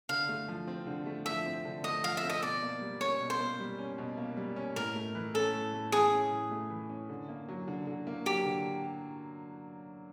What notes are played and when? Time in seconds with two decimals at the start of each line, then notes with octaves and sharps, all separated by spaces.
0.09 D3 F5
0.29 A3
0.48 F3
0.68 C4
0.87 D3
1.06 A3
1.25 F3 E5
1.46 C4
1.65 D3
1.84 A3 D#5
2.03 F3 F5
2.17 E5
2.23 C4
2.30 D#5
2.43 B2 D5
2.62 A#3
2.81 G3
3.01 C#4 C#5
3.20 B2
3.30 C5
3.39 A#3
3.60 G3
3.78 C#4
3.98 B2
4.17 A#3
4.37 G3
4.56 C#4
4.76 A2 A#4
4.95 A3
5.15 E3
5.34 C#4 A4
5.54 A2
5.74 A3
5.92 E3 G#4
6.12 C#4
6.31 A2
6.51 A3
6.70 E3
6.89 C#4
7.09 D3
7.29 A#3
7.49 F#3
7.68 D3
7.87 D3
8.07 A#3
8.26 F#3 G4
8.45 D3